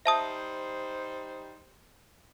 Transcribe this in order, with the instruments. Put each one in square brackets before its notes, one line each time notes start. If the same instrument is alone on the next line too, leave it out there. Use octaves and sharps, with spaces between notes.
[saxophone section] G3 D#4 C5 [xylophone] E5 A5 D#6